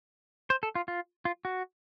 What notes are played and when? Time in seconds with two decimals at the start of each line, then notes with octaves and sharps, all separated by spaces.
0.50 C5
0.63 A4
0.75 F4
0.88 F4
1.25 F4
1.45 F#4